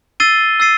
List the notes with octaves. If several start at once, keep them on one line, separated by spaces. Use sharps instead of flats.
E6 A6 C7 D#7 G7
E6 A6 C7 D#7